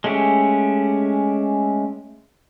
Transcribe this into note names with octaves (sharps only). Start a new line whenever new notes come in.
G#3 A3 C#4 G4